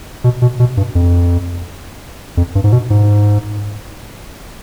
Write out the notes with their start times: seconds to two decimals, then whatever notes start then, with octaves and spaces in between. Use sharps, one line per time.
0.24 B2
0.42 B2
0.60 B2
0.77 G2
0.95 F2
2.37 F2
2.55 G2
2.64 G#2
2.73 B2
2.90 G#2